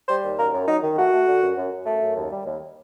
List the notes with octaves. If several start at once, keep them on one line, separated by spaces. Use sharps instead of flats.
G3 C5
D#2
F#2 A#4
F#2
F#3 D#4
D#3
A3 F#4
A3
D3
F#2
F#2
F#2
A3
F#2
D#2
G3
D#2